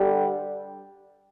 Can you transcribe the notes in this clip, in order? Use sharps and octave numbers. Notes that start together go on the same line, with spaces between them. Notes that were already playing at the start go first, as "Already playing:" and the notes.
Already playing: G2 D3 G3